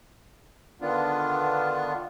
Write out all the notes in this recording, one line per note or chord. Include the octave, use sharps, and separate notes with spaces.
D3 D#3 B3 D4 F4